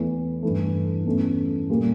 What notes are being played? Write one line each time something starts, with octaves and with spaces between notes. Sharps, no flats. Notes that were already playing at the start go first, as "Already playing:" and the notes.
Already playing: E2 E3 A3
G2 E3 A3
E2 E3 A3 C#4
A#2 G3 A#3